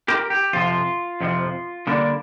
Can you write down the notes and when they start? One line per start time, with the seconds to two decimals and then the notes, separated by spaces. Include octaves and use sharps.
0.08 G4 A#4
0.30 G4
0.53 F2 C3 F3 F4
1.20 F2 C3 F3
1.87 D3 G3 A#3 D4